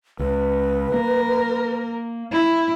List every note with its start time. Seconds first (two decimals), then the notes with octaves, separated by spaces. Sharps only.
0.19 C#2 B4
0.94 A#3 A#4
2.32 E4